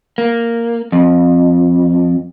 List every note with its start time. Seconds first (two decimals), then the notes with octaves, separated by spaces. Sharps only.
0.18 A#3
0.92 F2